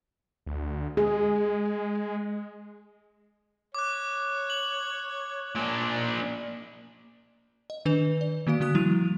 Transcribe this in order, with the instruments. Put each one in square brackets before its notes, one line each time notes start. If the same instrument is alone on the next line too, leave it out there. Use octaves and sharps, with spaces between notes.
[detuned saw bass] D2
[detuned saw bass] G#3 [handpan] G#4
[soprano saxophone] C#5 [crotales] D6 F#6
[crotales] F#7
[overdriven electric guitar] A#2 D4 [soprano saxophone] G#5
[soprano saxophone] D#4
[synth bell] D#5
D#3 D4 B4 F7
D5
D#3 A#3 F#4 F5 D7
D3 A#3 F#4 D#6 F#6
F3 G3 E4 D#7 F7